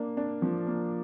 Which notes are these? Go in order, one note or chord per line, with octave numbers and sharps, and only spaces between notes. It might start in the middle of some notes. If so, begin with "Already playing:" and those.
Already playing: A#3 D4
D4
F3
A#3